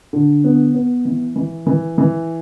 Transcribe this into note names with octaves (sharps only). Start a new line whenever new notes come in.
D3
B3
B3
E3
E3
E3
E3